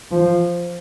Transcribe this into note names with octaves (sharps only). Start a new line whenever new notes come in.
F3